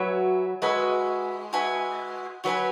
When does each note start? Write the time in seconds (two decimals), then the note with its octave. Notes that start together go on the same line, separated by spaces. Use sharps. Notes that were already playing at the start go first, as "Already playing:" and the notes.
Already playing: F#3 F#4 B4 E5 G#5
0.62 G#3 F#4 B4 E5 G#5
1.53 F#4 B4 E5 G#5
2.44 F#3 F#4 B4 E5 G#5